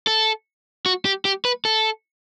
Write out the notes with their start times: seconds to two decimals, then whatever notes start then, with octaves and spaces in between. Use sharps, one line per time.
0.07 A4
0.86 F#4
1.05 G4
1.25 G4
1.45 B4
1.65 A4